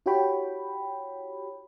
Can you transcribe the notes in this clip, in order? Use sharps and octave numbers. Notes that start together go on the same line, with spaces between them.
E4 F#4 G4 C#5 G5 B5